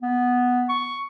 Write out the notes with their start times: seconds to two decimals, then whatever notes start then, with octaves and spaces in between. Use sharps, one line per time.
0.02 B3
0.69 C#6